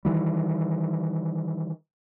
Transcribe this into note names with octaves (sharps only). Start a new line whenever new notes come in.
D#3 E3 G3